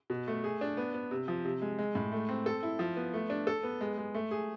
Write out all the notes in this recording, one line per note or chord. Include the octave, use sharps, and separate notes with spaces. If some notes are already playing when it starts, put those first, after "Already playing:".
B2
A3
G#4
D4
B3
B3
C3
F3
C3
G#3
G#3
A2
A3
C4
A4
E4
F3
B3
A3
D4
A4
B3
G#3
G#3
A3
G#4